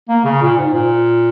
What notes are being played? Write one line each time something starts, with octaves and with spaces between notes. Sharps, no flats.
A#3
C#3
A#2
G#2
A#2